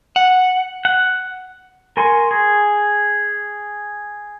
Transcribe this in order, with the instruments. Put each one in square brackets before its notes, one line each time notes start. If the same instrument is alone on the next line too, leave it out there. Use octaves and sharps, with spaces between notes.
[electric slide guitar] F#5
[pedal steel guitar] F#5
A#4 G#5 C6 C#6
G#4